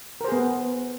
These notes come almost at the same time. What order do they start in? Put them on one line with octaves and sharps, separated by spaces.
A#4 C5 G#4 B3